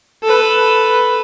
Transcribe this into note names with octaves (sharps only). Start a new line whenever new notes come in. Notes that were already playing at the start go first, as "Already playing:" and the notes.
A4 B4